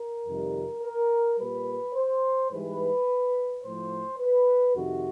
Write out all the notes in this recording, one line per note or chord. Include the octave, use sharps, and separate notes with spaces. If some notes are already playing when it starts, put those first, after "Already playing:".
Already playing: A#4
F2 C3 D#3 G3
A#4
A#2 G3 B4
C5
G#2 E3 G3 B4
A2 F3 C5
B4
F2 C3 D#3 F#4